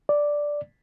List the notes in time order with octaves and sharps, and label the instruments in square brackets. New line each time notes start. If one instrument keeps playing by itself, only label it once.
[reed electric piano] D5